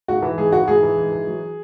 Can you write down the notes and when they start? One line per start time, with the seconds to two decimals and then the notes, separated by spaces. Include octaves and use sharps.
0.08 G#2 F#4
0.23 E3
0.38 G#2 G#4
0.52 E3 F#4
0.68 G#2 G#4
0.83 E3
0.97 G#2
1.12 E3
1.27 F#3